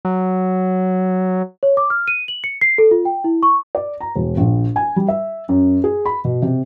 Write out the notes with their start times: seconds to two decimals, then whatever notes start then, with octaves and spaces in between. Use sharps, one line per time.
0.05 F#3
1.63 C#5
1.77 D6
1.90 F6
2.08 D#7
2.28 F#7
2.44 C#7
2.61 C7
2.78 A4
2.91 F4
3.05 G5
3.24 E4
3.43 C#6
3.75 D5
4.00 A#5
4.16 E1
4.37 A#1
4.76 G#5
4.96 G3
5.08 E5
5.49 F#2
5.84 G#4
6.06 B5
6.24 B2
6.42 C3